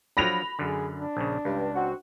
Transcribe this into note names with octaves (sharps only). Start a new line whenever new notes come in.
F3 F#3 D4 B5 A#6 F7
F#2 D3 G#4
D4
A#1 C#3
C#2 G2
C4 F#4